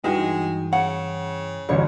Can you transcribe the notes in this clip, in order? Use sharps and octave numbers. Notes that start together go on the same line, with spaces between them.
G2 E3 G#3 D#4 F#4 G5
C#3 F#5
A1 D2 G2 C#5